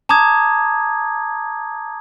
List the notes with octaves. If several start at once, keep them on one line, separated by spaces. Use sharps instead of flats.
A5 A#5 D6 D#6 G#6